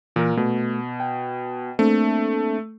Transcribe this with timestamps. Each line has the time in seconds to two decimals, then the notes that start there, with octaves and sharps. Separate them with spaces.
0.16 A#2 E3 A#4
0.37 B2 A3
1.00 G5
1.79 A3 A#3 C4 D4